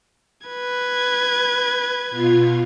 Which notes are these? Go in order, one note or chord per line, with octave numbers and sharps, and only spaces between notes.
B4 G#6
B2 F4